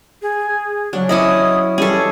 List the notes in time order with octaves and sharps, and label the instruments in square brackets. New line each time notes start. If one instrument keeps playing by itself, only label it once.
[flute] G#4
[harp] C#3 F#3 F#4 [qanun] D4
[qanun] C#4 E4 B5 [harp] D#5 D6 [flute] D#6
[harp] E3 G3 [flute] C#4 [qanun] G#4 A4